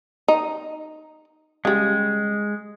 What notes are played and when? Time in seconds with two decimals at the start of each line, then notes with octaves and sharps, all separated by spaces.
0.28 D#4
1.65 C#3 G3 G#3